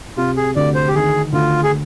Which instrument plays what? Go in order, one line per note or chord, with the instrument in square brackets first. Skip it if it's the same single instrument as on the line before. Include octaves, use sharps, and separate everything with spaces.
[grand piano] C3 [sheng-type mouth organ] F4
[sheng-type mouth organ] G#4
[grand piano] D2 [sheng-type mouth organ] D5
[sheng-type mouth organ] C5
G4
[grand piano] D#3 [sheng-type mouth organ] G#4
[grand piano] D2 [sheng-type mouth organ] F4
[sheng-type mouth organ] G#4